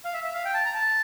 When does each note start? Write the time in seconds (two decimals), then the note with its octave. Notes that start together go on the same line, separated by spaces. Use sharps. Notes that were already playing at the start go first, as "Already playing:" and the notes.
0.05 F5
0.14 E5
0.24 E5
0.34 F5
0.45 G5
0.54 A5
0.65 A#5
0.75 A5